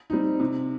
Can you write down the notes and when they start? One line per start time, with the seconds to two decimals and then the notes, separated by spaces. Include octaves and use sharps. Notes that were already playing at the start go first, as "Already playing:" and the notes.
0.10 G3 C4 D#4
0.40 C3